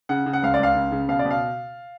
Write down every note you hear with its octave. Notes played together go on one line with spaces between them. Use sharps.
C#3 F#5
C#3
F#5
C#2 F5
D5
C#2 F5
C#3
C#3
B2 F5
D5
B2
F5